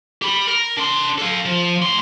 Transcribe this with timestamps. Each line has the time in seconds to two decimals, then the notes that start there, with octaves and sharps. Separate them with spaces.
0.22 G4 B5
0.47 A#4
0.77 D4 C6
1.18 A4 F5
1.45 F3
1.82 A2 C6